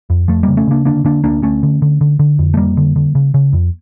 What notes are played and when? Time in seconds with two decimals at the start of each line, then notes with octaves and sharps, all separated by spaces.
0.10 F2
0.28 F2 F3 A3
0.43 C#3 G3 A#3
0.57 A3 C#4
0.67 C#3 A#3 D4
0.85 D3 A#3 D4
1.04 D3 A#3 D4
1.24 D2 A#3 D4
1.42 D2 A3 C#4
1.63 D3
1.82 D3
2.01 D3
2.19 D3
2.39 F2
2.54 A3
2.57 F2 G3 A#3
2.77 D3
2.96 D3
3.15 C#3
3.34 C#3
3.53 F2